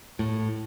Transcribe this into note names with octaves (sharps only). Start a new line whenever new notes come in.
A2